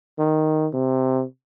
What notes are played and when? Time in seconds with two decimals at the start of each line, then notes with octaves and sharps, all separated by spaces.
0.18 D#3
0.74 C3